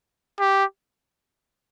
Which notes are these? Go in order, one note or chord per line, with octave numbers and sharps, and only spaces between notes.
G4